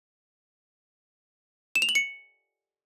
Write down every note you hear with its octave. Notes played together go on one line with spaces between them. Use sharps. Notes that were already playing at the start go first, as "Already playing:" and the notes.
E7
F7
F#7
C#7